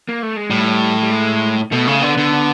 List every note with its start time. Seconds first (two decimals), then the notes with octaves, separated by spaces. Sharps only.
0.09 A#3
0.23 A3
0.36 G#3
0.50 A2 G3
1.03 G3
1.11 G#3
1.72 B2 A3
1.88 C#3
2.02 D3 B3
2.17 D3